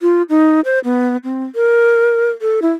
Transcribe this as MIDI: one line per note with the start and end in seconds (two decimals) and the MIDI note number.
0.02 0.22 65
0.29 0.61 63
0.65 0.79 72
0.84 1.17 59
1.24 1.45 60
1.55 2.30 70
2.41 2.60 69
2.62 2.72 64